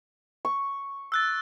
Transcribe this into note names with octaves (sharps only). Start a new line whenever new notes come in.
C#6
E6 F#6 A6